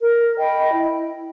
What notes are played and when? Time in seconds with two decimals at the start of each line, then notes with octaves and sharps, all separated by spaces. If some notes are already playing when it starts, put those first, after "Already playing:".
0.01 A#4
0.37 D#5 G5 B5
0.73 E4